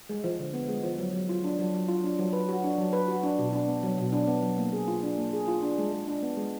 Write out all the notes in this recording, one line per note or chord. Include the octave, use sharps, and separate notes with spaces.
G#3
F3
D3
B3
G#3
F3
F#3
F#3
F4
D4
F#3
F#3
F4
D4
F#3
B4
F#4
D4
F#3
B4
F#4
D4
B2
D4
B3
F#3
B2
D4
B3
F#3
A#3
G#4
F4
D4
A#3
G#4
F4
D4
G#3
G#3
D4
B3
G#3